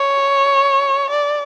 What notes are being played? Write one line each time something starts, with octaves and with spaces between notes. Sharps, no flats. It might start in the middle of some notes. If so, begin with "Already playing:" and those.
Already playing: C#5
D5